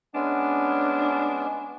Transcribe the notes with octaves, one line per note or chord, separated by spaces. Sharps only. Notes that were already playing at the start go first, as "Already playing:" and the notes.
G#3 B3 C#4 D4